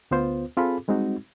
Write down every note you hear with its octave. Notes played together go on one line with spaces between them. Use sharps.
D2 B3 F4 C5
C4 F4 G#4 A4 B5
G3 G#3 C4 D#4 F#4